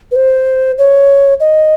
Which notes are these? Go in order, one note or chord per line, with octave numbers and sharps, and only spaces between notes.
B4
C5
C#5
D#5